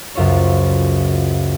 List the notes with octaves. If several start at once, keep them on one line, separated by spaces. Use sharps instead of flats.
C#2 F#2 F4 C5 C#5